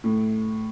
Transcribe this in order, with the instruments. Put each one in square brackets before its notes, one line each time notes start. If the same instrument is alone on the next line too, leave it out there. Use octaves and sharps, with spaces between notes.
[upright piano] A2